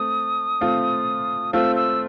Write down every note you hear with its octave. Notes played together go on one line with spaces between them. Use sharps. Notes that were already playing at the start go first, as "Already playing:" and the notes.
Already playing: A3 C4 D#6
A3 C4 F4
A3 C4 F4 E6
E6